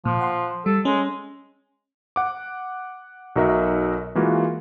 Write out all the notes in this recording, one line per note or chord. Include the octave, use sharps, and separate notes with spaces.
A#2 F3
F#5 C6
G3 A4
G#3 C#4
F#5 D6
B1 D#4 F#4 A#4 D#5 E5
E3 G#3 A#3 F4 F#4